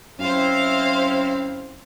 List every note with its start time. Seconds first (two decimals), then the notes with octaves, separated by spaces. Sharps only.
0.19 F#2 C4 E4 C5 F5